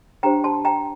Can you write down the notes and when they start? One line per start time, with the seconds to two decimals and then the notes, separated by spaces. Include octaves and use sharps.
0.23 D4 G4 C5 G5 A#5
0.44 A5 C6
0.65 G5 A#5